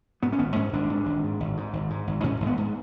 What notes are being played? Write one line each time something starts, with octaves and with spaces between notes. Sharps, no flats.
G#2 B3
C#4
G#1 B3
G#2 C#4
G#1 D4
G#2
G#1
G#2
G#1
G#2
G#1
G#2
G#1
G#2 C#4
G#1
B3
G#2